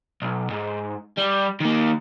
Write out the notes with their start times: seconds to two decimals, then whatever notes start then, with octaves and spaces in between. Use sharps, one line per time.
0.22 B1
0.50 G#2
1.17 G3
1.60 D#3 A#3